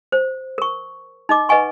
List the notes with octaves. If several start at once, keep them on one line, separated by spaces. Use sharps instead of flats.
C5
A#4 C#6
D#4 D#5 D6
B4 D#5 F#5 G#5 C#6